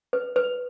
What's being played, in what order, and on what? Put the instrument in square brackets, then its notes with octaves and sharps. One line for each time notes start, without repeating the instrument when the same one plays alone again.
[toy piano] B4
B4